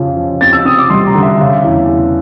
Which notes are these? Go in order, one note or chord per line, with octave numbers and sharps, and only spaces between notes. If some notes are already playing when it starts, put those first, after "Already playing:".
Already playing: F2 C#3 F3
F3
C4 A6
E6
C4 D#6
D6
G3 C6
A#5
D3
E5
C#3
E2
E2